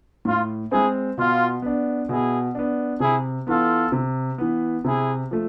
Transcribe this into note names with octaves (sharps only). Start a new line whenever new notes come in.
A2 F4
G#3 C4 E4 G#4
B2 F4
B3 D4
B2 E4 G#4
B3 D4
C3 E4 G#4
E3 B3 F4 A4
C3
E3 B3
C3 E4 G#4
F3 A3